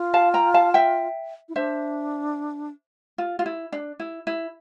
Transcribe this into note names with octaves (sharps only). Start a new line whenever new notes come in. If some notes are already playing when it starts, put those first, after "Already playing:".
Already playing: F4
F5 A5
G5 A#5
F5 A5
E5 G5
E4
D4 C5 E5
F4
F4
E4
D4
E4
E4